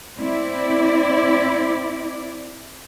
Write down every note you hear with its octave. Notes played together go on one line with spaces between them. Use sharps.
C4 E4 D5